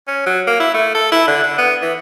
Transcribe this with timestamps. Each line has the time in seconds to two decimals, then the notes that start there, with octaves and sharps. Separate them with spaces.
0.08 C#4
0.26 F#3
0.47 A#3
0.60 E4
0.75 A3
0.95 A4
1.12 E4
1.27 D3
1.44 D3
1.58 B3
1.82 E3